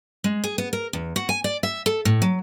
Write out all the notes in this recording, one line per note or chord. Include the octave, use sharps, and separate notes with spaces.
G#3
G#4
B3
A#4
E2
F#4
G#5
D5
E5
A4
A2
F#3